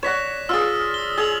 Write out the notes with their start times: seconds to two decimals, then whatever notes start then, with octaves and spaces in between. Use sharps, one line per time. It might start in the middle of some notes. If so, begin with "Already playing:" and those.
0.03 C#5 D5 F#5 A#6 B6 E7
0.49 F4 G#4 E6 F6 A6
0.94 D#6 G7
1.18 G#4 E6 F7 F#7